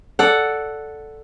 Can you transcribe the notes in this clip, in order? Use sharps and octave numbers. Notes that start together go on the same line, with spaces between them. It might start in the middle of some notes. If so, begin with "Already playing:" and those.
A4 D5 F#5